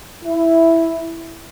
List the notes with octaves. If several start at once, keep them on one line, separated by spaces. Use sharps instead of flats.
E4